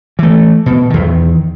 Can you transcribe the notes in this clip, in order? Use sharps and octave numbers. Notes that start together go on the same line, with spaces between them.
E3 A3
B2
E2 D#3